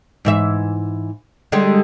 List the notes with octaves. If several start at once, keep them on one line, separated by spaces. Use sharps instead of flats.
G#2 E3 E5
D3 G3 G#3